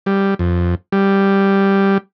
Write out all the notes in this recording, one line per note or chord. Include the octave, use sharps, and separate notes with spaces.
G3
F2
G3